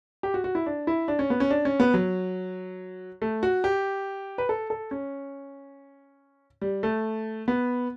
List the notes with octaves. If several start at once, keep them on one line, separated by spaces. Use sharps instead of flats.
G4
F#4
F#4
E4
D4
E4
D4
C#4
B3
C#4
D4
C#4
B3
F#3
A3
F#4
G4
B4
A4
A4
C#4
G3
A3
B3